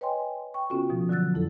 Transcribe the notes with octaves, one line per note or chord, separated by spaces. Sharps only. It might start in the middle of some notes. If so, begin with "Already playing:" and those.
B4 C#5 D#5 G5 G#5 C6
G5 C#6
C#3 B3 C#4 F4 F#4 A4
B2 F3
D3 F#3 E6 F#6 A6
F2 E4 A4